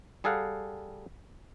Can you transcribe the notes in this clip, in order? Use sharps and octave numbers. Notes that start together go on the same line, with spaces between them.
G3 G#4 A4 F5 F#5